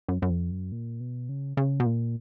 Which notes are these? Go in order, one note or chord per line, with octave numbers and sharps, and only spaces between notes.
F#2
F#2
F2
F#2
A#2
B2
C#3
C#3
B2
A#2